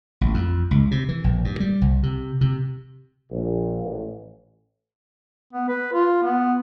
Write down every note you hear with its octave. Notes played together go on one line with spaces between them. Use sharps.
A1
F2
C#2
C3
E3
A#1
G2
G3
C2
C3
C3
A#1
A1
B3
B4
F4
B3